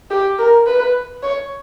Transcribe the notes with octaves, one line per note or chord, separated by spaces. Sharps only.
G4
A#4
B4
C#5